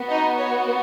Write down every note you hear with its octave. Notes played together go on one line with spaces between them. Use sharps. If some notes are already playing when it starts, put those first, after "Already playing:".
Already playing: B3 F#4
D#4 D#5
C#5